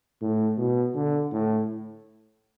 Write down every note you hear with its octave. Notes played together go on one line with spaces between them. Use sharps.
A2
B2
D3
A2